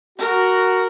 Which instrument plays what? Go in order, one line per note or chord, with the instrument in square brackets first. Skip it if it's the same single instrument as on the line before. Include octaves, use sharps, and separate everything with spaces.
[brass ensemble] F#4 [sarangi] A#4